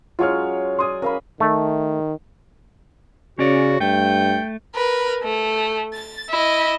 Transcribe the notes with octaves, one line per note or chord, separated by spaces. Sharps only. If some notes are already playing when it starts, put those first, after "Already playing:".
F#3 G#3 C#4 F4 C#5 F6
D5 G#5 C6 D#6
C#4 A#4 F5 B5
D#3 A3
C#3 C#4 F#4 C#5 D5
G2 A3 G5
A#4 B4
A3
A6
E4 D#5